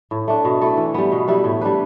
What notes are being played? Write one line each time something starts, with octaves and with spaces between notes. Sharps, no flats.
A2
A3 D4
B2
A3 E4 A4
E3
G3 B3
B2
G3 E4 B4
A2
G3 D4 B4